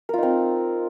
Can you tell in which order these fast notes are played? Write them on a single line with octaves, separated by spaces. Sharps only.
A#4 F4 D#4 C4